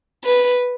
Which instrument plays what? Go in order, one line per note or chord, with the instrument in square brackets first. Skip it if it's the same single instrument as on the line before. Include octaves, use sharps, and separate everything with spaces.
[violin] B4